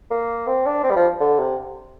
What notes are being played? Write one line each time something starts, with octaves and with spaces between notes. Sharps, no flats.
A#3
C4
D4
C4
G3
F3
D3
C3